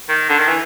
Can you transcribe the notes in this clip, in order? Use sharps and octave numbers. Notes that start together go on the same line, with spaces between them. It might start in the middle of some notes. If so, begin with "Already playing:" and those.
D#3
D3
D#3
E3